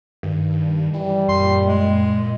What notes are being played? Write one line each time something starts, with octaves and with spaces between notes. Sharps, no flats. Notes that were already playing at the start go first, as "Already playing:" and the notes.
G2 D#3
E3 G3
F#2 A#2 C6
G#3